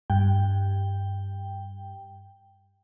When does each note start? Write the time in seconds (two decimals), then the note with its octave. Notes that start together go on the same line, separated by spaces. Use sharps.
0.10 G2 G5